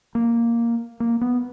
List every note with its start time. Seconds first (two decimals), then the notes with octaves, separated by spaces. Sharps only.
0.15 A#3
1.00 A#3
1.21 B3